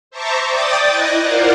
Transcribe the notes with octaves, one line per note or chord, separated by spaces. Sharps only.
C5 E5 A5 A#5 C#6 D6
D5 G5 D6 D#6 G6 A6
E4 D#5 F#6 G#6 A#6
F4 A#4 C5 D5 F#5